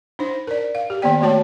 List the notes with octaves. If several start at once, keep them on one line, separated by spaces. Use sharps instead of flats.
D4 D#4 C5
A#4 D5
F5
G4
D#3 A#3 B3 D5 G5
D#3 A3 A#3 F#4 C#5 A5